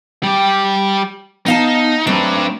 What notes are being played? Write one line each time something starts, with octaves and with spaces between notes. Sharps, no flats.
G3 G4
B3 D#4 F5 A5
F#3 A3 C4 D4 B4